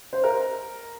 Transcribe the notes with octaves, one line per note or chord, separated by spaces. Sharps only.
C5
A#4